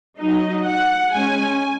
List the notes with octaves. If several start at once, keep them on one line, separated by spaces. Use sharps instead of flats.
F#3 D#4 D#5
F#5
G#3 C#4 G#5